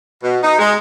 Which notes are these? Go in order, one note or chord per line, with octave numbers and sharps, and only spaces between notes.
B2
D#4
G#3